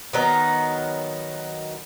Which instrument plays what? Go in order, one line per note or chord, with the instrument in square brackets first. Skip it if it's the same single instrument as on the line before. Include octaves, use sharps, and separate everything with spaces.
[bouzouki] D#3 F#3 B3 D#4